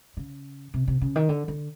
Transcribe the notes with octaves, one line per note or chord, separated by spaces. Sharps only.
C#3
C3
C3
C#3
D#3
D3
D3